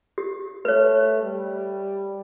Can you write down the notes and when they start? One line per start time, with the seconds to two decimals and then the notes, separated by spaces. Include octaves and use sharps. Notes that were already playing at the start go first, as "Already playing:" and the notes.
0.18 G4
0.65 A3 B4 C#5
1.23 G3